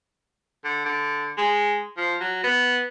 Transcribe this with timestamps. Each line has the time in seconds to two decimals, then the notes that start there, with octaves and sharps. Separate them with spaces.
0.65 D3
0.86 D3
1.38 G#3
1.98 F3
2.21 F#3
2.44 B3